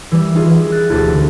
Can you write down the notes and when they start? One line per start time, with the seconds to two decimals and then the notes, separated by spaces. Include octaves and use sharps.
0.12 E3 G3
0.35 D#4 F4 G#4
0.49 E3
0.72 F#6 A6
0.90 E1 D2 E4 G4 A6
1.12 D3